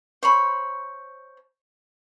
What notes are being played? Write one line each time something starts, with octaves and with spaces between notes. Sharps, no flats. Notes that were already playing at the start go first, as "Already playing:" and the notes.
C5 C#5 B5